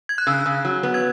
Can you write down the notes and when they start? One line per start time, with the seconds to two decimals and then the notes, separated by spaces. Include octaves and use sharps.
0.09 G#6
0.18 F#6
0.27 C#3 E6
0.46 C#3
0.65 F#3
0.83 B3
0.94 G#6